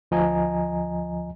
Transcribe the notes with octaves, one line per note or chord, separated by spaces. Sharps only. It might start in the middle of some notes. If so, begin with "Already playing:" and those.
D2 F3 D#5 G#5 A#5